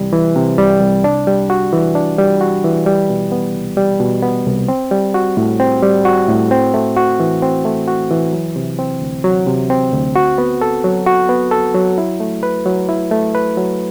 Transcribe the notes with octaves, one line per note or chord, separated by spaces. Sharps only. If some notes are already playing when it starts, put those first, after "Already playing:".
Already playing: C2 C3 E3 G3
E3
C3
G3
C2
D4
G3
F#4
E3
D4
G3
F#4
E3
G3
B2
B3
C2
G3
B2
B3
C2
C4
G3
F#4
A2
C4
G3
F#4
A2
C4
A3
F#4
E3
C4
A3
F#4
E3
F#3
C3
C4
D2
F#3
C3
C4
D2
F#4
B3
A4
F#3
F#4
B3
A4
F#3
E4
A3
B4
F#3
E4
A3
B4
F#3